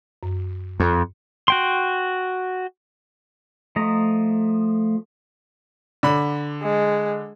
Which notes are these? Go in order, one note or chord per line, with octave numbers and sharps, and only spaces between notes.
F#2
F2
F#4 G5 C6
F3 A3 D#5 A#5
D3 B5
G#3